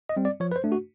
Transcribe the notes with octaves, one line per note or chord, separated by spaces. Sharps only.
D#5
G3 C4
D5
F3 C#5
B4
C5
A3 D4
F#4